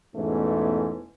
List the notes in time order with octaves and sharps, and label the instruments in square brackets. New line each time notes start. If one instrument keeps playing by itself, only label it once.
[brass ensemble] E2 G#2 B2 E3 A3 C#4